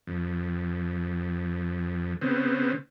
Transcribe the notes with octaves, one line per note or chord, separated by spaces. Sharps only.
F2
C#3 B3 C4